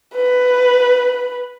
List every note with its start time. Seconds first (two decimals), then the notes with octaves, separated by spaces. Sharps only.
0.16 B4